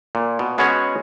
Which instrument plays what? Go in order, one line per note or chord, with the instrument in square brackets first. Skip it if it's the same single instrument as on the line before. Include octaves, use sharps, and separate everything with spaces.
[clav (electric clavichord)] A#2
B2
G#3 B3 C#4 F#4 G#4 C#5